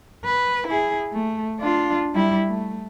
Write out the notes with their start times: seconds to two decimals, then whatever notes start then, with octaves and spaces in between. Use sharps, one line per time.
0.24 B4
0.67 E4 G#4
1.12 A3
1.60 D4 F4
2.14 G3 E4
2.48 A3